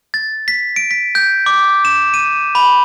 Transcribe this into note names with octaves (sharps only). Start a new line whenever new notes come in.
A6
B6
D7
B6
G6
D6
E7
D#7
B5